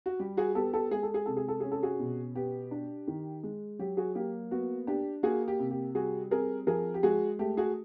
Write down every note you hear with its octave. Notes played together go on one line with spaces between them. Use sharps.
F#4
G3 G4
F#4 G#4
B3 G4 A4
G4 A4
G#3 G#4
A4
G#4
C3 A4
G#4
A4
C#4 G#4
A4
F#4 G#4
B2
B3 G4
D4
D#3
G#3
F#3 G4
F#4 G#4
A#3 G4
B3 F#4
D4 G4
A#3 F#4 G#4
G4
C3
G4
G3 F#4 G#4
C4 G#4 A#4
F3 G#4 A#4
G4
G#3 F#4 G#4
A3 G4
F#4 G#4